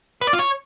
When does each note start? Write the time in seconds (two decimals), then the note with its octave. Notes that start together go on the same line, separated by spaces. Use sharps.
0.21 B4
0.27 D5
0.33 F4
0.39 C#5